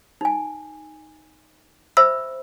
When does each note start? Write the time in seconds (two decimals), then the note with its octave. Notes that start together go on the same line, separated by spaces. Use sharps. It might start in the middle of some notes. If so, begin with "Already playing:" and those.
0.21 D#4 G#5
1.97 C5 E5 B5 E6